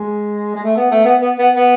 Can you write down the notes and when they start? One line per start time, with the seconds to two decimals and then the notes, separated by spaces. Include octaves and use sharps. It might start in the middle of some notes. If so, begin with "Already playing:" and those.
Already playing: G#3
0.55 G#3
0.63 A3
0.77 B3
0.91 A3
1.05 B3
1.21 B3
1.39 B3
1.55 B3